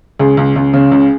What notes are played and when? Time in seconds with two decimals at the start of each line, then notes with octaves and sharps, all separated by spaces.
0.20 C#2 G#4
0.37 C#2
0.56 C#2
0.74 C#3
0.92 C#2